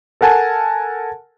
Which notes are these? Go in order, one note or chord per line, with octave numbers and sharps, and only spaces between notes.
A4 A#4 F#5 G#5 A5